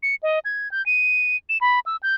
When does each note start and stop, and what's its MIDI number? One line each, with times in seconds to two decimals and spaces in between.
0.03 0.15 97
0.23 0.39 75
0.45 0.70 92
0.71 0.84 91
0.86 1.36 99
1.49 1.58 100
1.61 1.79 83
1.86 1.96 88
2.03 2.15 91